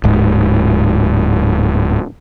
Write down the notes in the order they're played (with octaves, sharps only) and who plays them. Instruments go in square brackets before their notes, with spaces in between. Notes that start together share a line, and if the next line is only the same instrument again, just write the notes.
[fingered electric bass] D1 G#2